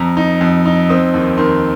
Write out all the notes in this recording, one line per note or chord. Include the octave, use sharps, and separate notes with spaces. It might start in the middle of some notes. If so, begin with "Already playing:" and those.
Already playing: F2 A#5
D#4
F2
D#4
C4 D#6
D#2
D#3 C6